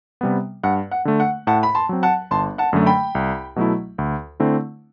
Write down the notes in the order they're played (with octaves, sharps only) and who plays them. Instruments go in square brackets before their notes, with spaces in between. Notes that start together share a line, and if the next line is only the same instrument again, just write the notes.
[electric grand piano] C3 G3 B3
[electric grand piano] G2 [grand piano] F#5
[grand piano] F#5
[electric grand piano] D3 A3
[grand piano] F#5
[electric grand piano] A2 [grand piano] F#5 A5
[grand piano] B5
A5 C6
[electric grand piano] F#3 C4
[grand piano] F#5 A5
[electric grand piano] G1 [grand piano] A5 C6
[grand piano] F#5 A5
[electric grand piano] F#2 D3 F#3 A3
[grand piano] G5 B5
[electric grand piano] C2
B2 F#3 A3 E4
D2
D3 A3 C4 E4